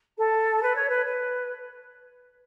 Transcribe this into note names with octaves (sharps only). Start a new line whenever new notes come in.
A4
B4
C#5
B4
B4